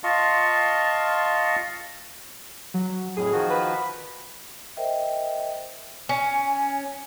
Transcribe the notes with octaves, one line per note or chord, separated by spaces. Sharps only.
F4 D#5 F5 A5 C6 C#6
F#3
F2 A2 G#4
D#3 F3 F#4
B4
A#4 C5 D#5 E5 G5
C#4 G#5